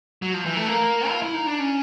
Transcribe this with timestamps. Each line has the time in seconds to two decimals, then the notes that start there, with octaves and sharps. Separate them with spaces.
0.22 F#3
0.34 F3
0.46 E3
0.56 A3
0.68 A#3
1.09 F4
1.22 E4
1.34 D#4
1.47 D4
1.59 C#4